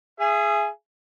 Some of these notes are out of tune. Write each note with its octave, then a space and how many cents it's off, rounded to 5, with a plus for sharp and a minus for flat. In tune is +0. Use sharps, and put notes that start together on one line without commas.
G#4 +0 E5 +40 G#5 +0